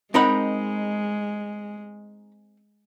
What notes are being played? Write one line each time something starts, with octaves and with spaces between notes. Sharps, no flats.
G#3 C4 D#4 A#4 F#5 A#5 B5